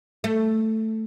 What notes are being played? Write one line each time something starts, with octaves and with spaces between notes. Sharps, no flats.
A3